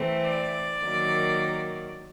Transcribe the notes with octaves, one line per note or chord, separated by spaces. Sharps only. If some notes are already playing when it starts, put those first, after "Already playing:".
Already playing: E3 A3 C4
D5
D#3 F#3 A#3